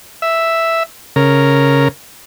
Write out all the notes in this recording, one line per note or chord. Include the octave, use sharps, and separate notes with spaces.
E5
C#3 A#4